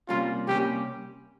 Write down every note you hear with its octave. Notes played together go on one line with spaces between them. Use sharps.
C3 G3 A#3 C#4 F4
C3 G3 A#3 C#4 G4